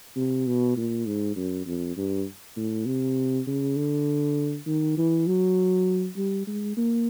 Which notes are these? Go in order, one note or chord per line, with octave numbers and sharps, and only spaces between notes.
C3
B2
A#2
G#2
F#2
F2
G2
A2
C3
C#3
D3
D#3
E3
F#3
G3
G#3
A#3